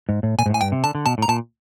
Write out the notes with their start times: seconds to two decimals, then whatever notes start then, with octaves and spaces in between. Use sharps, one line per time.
0.09 G#2
0.23 A2
0.39 A#2 G#5
0.46 G#2
0.50 A2 G#5
0.61 G2 G5
0.72 C3
0.84 D3 A5
0.95 D3
1.06 B2 A5
1.18 A2 A#5
1.28 A#2 A5